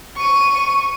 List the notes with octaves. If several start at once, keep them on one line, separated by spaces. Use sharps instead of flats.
C#6 D#7